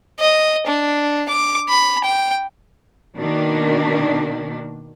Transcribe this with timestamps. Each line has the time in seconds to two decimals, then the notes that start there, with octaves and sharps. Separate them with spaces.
0.20 D#5
0.67 D4
1.29 D6
1.69 B5
2.04 G5
3.17 B2 D#3 A#3 D4